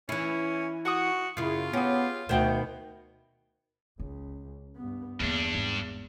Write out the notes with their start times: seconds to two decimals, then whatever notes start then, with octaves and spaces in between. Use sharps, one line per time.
0.09 E3 C#4 E4
0.85 F#4 F#5 C#6 D#6
1.37 F#2 C#3 E4 F4
1.73 B3 C#4 G4 G#4
2.29 D2 B2 D#3 C5 F#5 G5
4.00 C#2 C#4
4.77 G2 B3
5.20 E2 G2 D3 A#3 D4
5.55 G#1